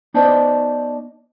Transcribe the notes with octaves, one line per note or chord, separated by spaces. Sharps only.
B3 D#4 C5 D5 D#5 A5